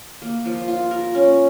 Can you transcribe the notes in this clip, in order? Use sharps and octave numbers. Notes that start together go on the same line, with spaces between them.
A#3
F3
F4
A#4
C#4